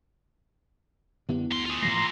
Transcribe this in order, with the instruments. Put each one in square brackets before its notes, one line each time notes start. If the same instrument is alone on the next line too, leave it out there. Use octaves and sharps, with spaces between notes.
[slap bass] F#2 D3 D4 [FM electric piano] B3 E4 G4
[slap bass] D2 [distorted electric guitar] G#2 C6
[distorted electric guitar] F4 G#4
[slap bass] G#2 E3 A3 [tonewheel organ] A#5 C6